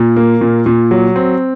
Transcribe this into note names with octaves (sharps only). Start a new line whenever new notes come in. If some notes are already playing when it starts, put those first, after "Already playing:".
Already playing: A#2
A#3
A#2
A#2
F#3
C4